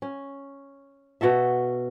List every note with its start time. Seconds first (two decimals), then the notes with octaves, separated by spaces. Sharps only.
0.02 C#4
1.21 B2 F#4 A4 E5